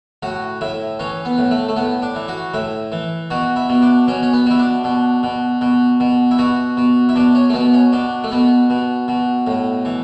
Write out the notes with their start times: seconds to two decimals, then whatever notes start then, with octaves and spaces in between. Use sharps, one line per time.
0.23 A2 F#4
0.61 A2 E4
0.99 E3 C#4
1.25 B3
1.38 A2
1.51 A3
1.69 A3
1.76 A2 B3
2.02 D4
2.15 E3
2.28 F#4
2.54 A2 E4
2.92 E3
3.30 B2 F#4
3.56 E4
3.69 B2
3.82 D4
4.07 B2 C#4
4.23 C#4
4.33 B3
4.46 B2 E4
4.59 D4
4.84 B2
5.23 B2
5.61 B2
6.00 B2
6.31 E4
6.38 B2 F#4
6.77 B2
7.09 E4
7.16 B2 D4
7.35 C#4
7.50 A3
7.54 B2 B3
7.73 C#4
7.93 B2 D4
8.24 A3
8.32 B2 B3
8.70 B2
9.08 B2
9.47 A2
9.85 E3